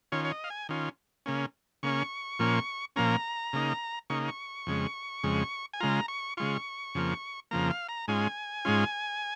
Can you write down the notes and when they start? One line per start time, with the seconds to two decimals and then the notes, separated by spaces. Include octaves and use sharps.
0.12 D#3 C#4 F4 C#5
0.25 C#5
0.32 D#5
0.44 F5
0.50 G#5
0.69 D#3 C#4 F4
1.26 C#3 A#3 C#4
1.83 C#3 A#3 C#4 C#6
2.39 A#2 F3 A#3 C#4
2.96 A#2 F3 A#3 C#4 A#5
3.53 C#3 A#3 D#4
4.10 C#3 A#3 D#4 C#6
4.28 C#6
4.67 F2 C#3 G#3
5.24 F2 C#3 G#3
5.73 G#5
5.80 C#3 G#3 F4 A#5
6.08 C#6
6.37 C#3 G#3 F4 C#6
6.95 F2 C#3 F3 A#3
7.51 F2 C#3 F3 A#3 A#5
7.70 F5
7.89 A#5
8.08 G#2 G#3 C#4 F4 G#5
8.65 G#2 G#3 C#4 F4